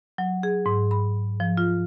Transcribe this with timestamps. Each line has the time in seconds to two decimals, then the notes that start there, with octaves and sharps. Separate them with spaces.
0.18 F#3
0.43 G#4
0.66 G#2
0.91 B5
1.40 F3
1.58 F4